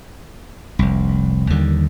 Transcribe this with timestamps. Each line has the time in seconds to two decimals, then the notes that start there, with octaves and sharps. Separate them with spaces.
0.79 F1 C2
1.50 D#2 D3 D#3 G3